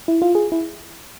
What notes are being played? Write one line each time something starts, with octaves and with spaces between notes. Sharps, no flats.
E4
F4
G#4
E4